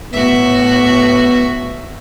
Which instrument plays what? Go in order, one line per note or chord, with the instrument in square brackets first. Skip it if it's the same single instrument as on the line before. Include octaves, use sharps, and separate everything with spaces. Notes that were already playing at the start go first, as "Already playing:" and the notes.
[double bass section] A2 [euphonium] B3 [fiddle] F#4 E5